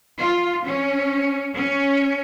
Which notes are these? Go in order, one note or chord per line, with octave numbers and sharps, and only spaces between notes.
F4
C#4
C#4